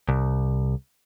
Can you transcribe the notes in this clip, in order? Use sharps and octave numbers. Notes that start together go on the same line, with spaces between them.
C2